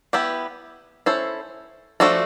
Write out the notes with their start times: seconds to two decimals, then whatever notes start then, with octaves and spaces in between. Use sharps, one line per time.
0.13 B3 E4 G4
1.06 C#4 E4 A4 C5
2.00 F3 A3 D4 F#4 A4